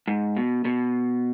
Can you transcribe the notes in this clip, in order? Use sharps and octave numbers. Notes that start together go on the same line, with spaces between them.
G#2
B2
B2